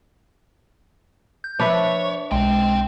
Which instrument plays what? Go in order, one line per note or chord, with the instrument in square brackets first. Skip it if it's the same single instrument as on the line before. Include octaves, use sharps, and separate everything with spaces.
[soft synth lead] G6
[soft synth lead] F3 [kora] D4 B4 E5 [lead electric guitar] C#5
[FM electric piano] B1 [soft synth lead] G#3 [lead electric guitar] C4 G5